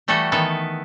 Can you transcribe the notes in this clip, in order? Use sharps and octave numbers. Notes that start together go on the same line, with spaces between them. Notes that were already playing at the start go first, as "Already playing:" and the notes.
E3 G3 A3 F#4 A4
D#3 E3 B3 A4 B4